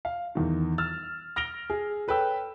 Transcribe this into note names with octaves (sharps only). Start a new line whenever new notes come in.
F5
E2 D#3
E6 F6 A6
F6 A#6 D7 F7 G7
G#4
A4 B4 C#5 G5 E6